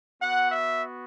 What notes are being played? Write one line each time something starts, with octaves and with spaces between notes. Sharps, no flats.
B3 F#4 F#5
E5